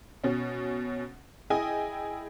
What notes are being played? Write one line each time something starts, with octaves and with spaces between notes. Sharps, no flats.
B2 C#4
E4 G#4 D#5 G5 G#5